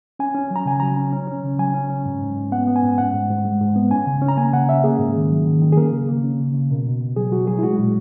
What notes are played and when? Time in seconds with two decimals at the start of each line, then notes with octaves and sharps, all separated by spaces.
0.19 C#4 G#5
0.35 C#4
0.51 F#3
0.56 A#5
0.66 C#3 G#5
0.80 F#3 A#5
0.97 C#4
1.13 C#4
1.27 C#4
1.44 C#3
1.59 F#3 G#5
1.74 C#4
1.90 C#4
2.06 G#2
2.21 G#2
2.36 G#2
2.52 B3 F#5
2.67 B3
2.76 G#5
2.83 G#2
2.98 G#2 F#5
3.14 G#2
3.30 G#2
3.45 G#3
3.61 G#2
3.76 B3
3.91 C#4 G#5
4.07 C#3
4.22 C#4
4.28 A#5
4.37 A#3 G#5
4.53 C#3 F#5
4.69 C#4 E5
4.84 A#3 G#4
4.99 G#2
5.16 D#3
5.31 F#3
5.46 D#3
5.62 D#3
5.72 G#4
5.77 A#3 A#4
5.93 C#3
6.08 A#3
6.24 C#4
6.40 C#3
6.54 C#3
6.71 B2
6.86 B2
7.01 B2
7.16 F#3 G#4
7.32 F#3 F#4
7.47 F#3 G#4
7.58 E4
7.63 G#3 F#4
7.79 A#2